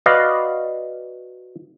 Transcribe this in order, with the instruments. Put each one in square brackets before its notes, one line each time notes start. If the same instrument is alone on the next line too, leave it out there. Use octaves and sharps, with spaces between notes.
[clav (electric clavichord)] F#4 B4 D5 D#5 F5